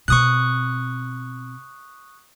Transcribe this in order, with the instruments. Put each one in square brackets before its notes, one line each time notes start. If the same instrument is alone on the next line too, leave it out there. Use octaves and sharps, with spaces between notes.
[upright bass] B2 C4 [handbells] C#6 D#6 F#6